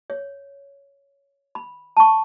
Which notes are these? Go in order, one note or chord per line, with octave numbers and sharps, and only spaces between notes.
C#5
B5
A5 C#6